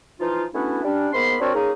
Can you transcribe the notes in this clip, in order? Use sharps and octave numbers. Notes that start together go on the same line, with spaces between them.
E3 F3 D#4 F4
A3 B3 C#4 D4 E4 F#4
G3 C#4 D4
G#2 A#3 B3 B5 C6
C4 D4 F#4 A#4 C#5 D5
A#3 C#4 D#4 G#4